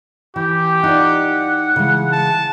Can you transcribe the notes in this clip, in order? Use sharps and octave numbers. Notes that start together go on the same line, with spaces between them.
E3 G4 G5
D#4 F4 D5 F#5
C#3 E3 G#3
A5